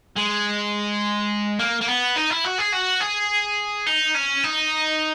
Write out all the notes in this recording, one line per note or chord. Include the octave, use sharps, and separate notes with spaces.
G#3
A#3
A#3
B3
D#4
E4
F#4
G#4
F#4
G#4
D#4
C#4
D#4